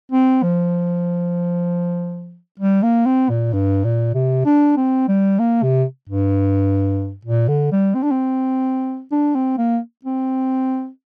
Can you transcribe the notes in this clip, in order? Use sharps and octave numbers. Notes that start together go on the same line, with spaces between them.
C4
F3
G3
A#3
C4
A#2
G2
A#2
C3
D4
C4
G3
A#3
C3
G2
A#2
D3
G3
C4
D4
C4
D4
C4
A#3
C4